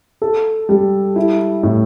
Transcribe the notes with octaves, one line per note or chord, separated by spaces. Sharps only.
A4
G3
E4
A2